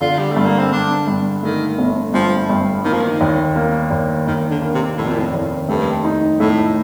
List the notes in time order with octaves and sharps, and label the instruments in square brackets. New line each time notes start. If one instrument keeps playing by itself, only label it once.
[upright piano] D3 [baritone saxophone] F4
[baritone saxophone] G3
[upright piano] G2 [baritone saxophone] A3
[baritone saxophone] A#3
C4
[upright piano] G2 [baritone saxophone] D4
[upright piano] G2
[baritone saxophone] D#3 [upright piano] A3
[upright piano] G1
[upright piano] G2 [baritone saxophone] F3
[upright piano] G2
[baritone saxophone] D#3 [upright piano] A#3
[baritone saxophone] F3
D#3
[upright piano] D#2
A#3
D#2
[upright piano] D#2 [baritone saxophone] D#3
[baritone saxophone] D3
[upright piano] A#3
[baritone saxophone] C3
[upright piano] F1 [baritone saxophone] A2
[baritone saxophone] A#2
A2
[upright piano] D#2
[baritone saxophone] G2 [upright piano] A3
[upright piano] D#4
[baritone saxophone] A2 [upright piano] A3